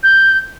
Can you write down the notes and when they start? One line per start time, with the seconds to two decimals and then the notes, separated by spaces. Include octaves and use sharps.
0.03 G6